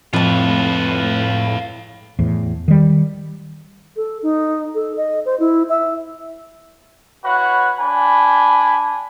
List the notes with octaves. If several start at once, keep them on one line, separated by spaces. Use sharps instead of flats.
F2 A2 F4 B4 A5
E2 A2
D#3 G3
A4
D#4
A4
D#5
C5
E4
E5
E4 F#4 B4 C#5 F#5
D4 G#5 B5